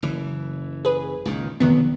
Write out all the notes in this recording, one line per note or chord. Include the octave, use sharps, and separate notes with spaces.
F#1 E3
G#4 B4
C#2 A#2 D#3
F1 B1 E2 D#3 F#3 B3